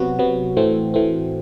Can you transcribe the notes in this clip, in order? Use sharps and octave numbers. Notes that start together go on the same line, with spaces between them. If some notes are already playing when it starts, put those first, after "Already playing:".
Already playing: C3 F#3 B3 F#4
C3 F#3 B3
A2 E3 A3 C4
A2 E3 A3 C4